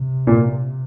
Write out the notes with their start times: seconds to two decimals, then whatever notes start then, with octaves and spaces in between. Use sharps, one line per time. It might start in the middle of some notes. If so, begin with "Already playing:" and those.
Already playing: C3
0.27 A#2